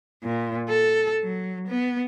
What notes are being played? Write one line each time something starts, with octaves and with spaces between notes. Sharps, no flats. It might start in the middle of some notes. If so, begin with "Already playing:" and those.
A#2
A4
F#3
B3